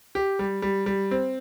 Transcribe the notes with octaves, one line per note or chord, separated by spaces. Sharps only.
G4
G3
G3
G3
C4